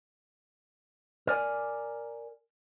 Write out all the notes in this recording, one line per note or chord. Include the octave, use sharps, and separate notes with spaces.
A#4 D5 G#5